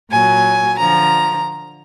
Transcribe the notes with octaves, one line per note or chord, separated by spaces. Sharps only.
A#2 F#3 G#5
D3 F3 A#5